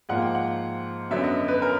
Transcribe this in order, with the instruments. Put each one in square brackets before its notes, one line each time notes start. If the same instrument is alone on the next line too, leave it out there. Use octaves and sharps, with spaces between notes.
[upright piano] G#2 F3 A#3 F#5
G5
F#5
F#2 D3 F#3 B3 E5
D#5
B4
A#4